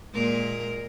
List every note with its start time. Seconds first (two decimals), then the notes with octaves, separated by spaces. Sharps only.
0.14 A#2 G#3 A#4